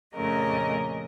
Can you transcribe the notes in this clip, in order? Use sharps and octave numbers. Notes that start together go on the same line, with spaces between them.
F2 A#2 C#3 A3 A#4 D#5